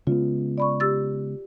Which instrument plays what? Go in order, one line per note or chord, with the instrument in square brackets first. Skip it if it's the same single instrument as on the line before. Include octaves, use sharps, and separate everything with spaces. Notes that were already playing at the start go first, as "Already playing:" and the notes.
[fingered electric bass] C#3 G#3 B3 [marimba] F4
[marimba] D5 B5 C#6
G4 E6 A6